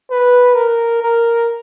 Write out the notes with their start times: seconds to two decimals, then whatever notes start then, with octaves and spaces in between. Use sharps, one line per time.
0.10 B4
0.56 A#4
1.02 A#4